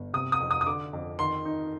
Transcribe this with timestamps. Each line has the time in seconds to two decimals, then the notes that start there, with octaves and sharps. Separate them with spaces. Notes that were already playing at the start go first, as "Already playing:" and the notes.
Already playing: G1
0.13 C3 D#6
0.32 D#6
0.40 F2
0.51 D#6
0.61 D#6
0.66 D3 D6
0.93 F2
1.19 D#3 C6
1.45 D#4